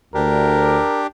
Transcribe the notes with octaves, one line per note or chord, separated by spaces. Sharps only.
D2 D4 G4 A#4